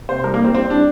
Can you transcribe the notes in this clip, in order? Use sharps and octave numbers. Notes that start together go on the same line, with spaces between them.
C3 C5
G3 A#4
A#3
G3
C4
G3 C4
G3 D4